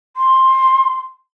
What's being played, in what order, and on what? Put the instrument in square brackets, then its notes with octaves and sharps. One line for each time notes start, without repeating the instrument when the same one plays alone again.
[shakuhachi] C6